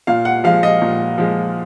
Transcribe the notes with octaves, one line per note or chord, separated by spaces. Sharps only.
A#2 F5
F#5
F3 G#3 F5
D#5
A#2
F3 G#3